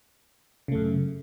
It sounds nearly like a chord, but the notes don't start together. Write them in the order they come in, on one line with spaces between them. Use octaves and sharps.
C#3 A3 F#2